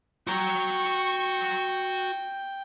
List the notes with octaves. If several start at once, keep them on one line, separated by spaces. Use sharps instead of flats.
F#4 G5 A#5 C#6